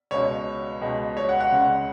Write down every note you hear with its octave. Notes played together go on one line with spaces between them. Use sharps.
C#2 B2 C#5
C#2 B2
C#5
F#5
F#5
C#2 C#3